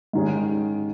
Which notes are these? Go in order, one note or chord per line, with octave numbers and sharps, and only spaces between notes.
G#2 D#3 G#3 C#4 G#4